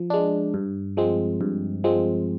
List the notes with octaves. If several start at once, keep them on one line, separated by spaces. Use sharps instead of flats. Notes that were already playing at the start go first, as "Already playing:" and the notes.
Already playing: F3
G#3 D4
G2
F3 G#3 C4
G2
F3 G#3 C4